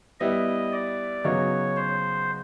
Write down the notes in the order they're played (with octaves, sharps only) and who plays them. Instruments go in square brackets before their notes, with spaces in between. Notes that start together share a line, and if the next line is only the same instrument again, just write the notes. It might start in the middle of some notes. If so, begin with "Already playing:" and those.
[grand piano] G3 B3 E4 [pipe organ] D#5
[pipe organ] D5
[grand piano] C#3 F#3 B3 D#4 F#4 [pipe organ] C#5
[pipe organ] C5